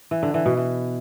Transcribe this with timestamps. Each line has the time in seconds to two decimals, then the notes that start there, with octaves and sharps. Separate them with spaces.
0.11 E3
0.23 D3
0.34 E3
0.46 B2
0.57 E3